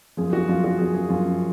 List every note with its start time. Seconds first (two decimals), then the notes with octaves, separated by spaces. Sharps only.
0.17 F#2 F3 G#4
0.33 F#4
0.48 F#2 F3 F4
0.64 F#4
0.78 F#2 F3 G#4
0.94 G#4
1.09 F#2 F3 F4